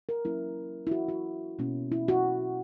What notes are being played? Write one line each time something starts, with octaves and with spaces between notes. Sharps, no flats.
A#4
F#3 A#3 C#4 E4
E4
F#4
F#4
B2 A#3 C#4
E4
F#4